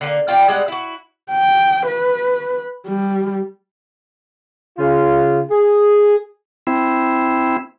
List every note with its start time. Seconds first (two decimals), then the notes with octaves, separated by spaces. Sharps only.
0.01 D3 F3 A#3
0.28 C3 F4 D5 G5
0.49 G3 G#3 F#5
0.68 E4 F#4
1.31 G5
1.87 B4
2.88 G3
4.78 C#3 F4
5.50 G#4
6.67 C4 E4